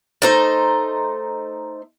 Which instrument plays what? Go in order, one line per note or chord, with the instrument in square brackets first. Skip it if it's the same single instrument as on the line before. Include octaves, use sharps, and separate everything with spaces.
[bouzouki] A3 D#4 C5